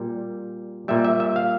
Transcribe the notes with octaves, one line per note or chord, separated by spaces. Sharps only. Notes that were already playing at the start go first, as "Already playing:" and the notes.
Already playing: A#2 G3
A#2 G3 E5
E5
E5
F5